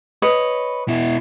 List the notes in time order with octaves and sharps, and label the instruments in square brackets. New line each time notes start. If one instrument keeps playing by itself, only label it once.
[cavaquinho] B4 C#5 D#5
[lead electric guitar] B2 E4